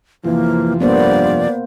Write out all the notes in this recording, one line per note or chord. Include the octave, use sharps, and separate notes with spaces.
F2 C3 E3 F3 A#3
G2 A#3 B3 C5 D5